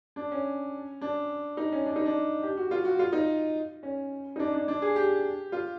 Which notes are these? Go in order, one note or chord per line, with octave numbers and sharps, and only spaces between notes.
D4
C#4
D4
D#4
C#4
D4
D#4
D4
G4
F#4
F4
F#4
F4
D#4
C#4
D#4
D4
D4
D4
G#4
G4
F4